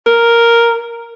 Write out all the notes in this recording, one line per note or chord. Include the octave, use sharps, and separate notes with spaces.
A#4